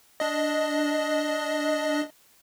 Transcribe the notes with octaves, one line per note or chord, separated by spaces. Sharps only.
D4 D#5